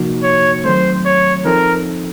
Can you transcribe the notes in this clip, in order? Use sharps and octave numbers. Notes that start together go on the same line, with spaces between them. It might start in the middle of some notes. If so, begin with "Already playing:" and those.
Already playing: C3 F3 A#3 D#4 F#4
C#5
D#3 F#3 A3 C4 C5
C#5
F3 C4 D#4 A4 A#4